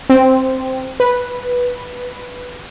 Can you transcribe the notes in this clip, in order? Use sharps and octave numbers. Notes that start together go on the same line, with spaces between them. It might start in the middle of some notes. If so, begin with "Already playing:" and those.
C4
B4